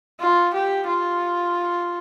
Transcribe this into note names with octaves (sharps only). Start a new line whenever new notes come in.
F4
G4
F4